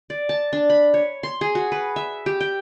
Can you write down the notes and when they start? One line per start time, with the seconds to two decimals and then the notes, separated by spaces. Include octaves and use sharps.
0.10 D5
0.29 A5
0.53 D4
0.70 B5
0.94 C#5
1.23 C6
1.41 G#4
1.55 F#4
1.72 B4
1.96 E5
2.26 G4
2.40 G5